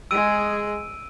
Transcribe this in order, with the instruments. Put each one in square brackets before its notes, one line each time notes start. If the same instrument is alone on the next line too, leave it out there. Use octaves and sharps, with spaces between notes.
[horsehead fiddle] G#3 G#4 [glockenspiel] E6 D7 D#7